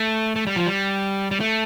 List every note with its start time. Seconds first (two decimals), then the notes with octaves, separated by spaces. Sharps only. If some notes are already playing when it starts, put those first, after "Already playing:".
Already playing: A3
0.36 A3
0.47 G3
0.56 F3
0.66 G3
1.31 G3
1.40 A3